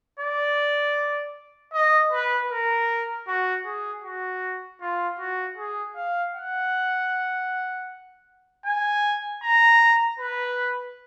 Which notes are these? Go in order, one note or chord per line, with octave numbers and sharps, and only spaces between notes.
D5
D#5
B4
A#4
F#4
G#4
F#4
F4
F#4
G#4
F5
F#5
G#5
A#5
B4